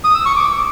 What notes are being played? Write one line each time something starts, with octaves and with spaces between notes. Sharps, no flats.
D#6
E6
C#6
D6